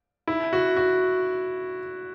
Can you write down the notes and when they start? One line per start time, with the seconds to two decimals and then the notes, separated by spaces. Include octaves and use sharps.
0.28 E4
0.53 F#4
0.76 F#4